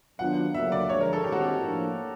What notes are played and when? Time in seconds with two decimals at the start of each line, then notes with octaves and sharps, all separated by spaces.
0.19 D#3 F#3 B3 D4 F4 F#5
0.54 D2 C#3 F#3 A#3 E5
0.72 D5
0.89 G2 D3 F3 G#3 C#5
1.01 A#4
1.13 A4
1.24 G2 D#3 G#3 C4 G4
1.32 F#4
1.41 G4
1.59 A2 F3 A#3 D4